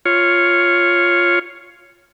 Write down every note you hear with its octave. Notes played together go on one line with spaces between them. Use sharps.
F4 C#5